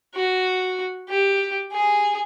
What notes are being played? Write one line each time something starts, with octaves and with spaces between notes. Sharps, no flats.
F#4
G4
G#4